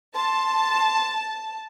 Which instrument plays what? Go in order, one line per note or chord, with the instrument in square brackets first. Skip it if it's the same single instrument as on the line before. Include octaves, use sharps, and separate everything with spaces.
[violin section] A5 [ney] C6